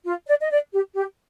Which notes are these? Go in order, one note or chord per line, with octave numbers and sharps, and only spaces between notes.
F4
D5
D#5
D5
G4
G4